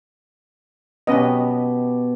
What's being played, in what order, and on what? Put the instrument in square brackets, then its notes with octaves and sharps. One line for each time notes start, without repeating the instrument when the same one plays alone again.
[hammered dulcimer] B2 G4 [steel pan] C#4 B4 D#5